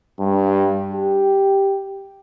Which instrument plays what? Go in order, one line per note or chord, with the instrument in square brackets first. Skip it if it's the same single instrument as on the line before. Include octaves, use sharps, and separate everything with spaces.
[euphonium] G2
G4